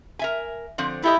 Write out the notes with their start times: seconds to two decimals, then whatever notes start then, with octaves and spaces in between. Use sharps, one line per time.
0.19 A#4 E5 G#5
0.78 D3 F3 C4
1.03 A3 E4 G4 D#5